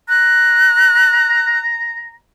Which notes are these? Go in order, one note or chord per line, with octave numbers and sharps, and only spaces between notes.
A#5 F#6